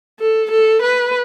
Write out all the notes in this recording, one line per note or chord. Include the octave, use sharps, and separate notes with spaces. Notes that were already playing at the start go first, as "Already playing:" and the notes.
A4
A4
B4